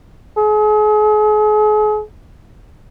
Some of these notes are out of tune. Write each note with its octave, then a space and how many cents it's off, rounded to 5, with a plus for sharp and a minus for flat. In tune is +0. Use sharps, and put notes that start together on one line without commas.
G#4 +40